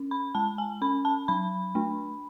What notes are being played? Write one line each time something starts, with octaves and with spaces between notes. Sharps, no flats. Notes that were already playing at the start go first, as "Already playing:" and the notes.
Already playing: C#4
B5
G#3 A5
G#5
C#4 B5
A5
F#3 B5
A3 D4